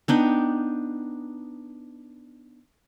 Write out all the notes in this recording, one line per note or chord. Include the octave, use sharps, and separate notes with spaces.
B3 D4 D#4 G5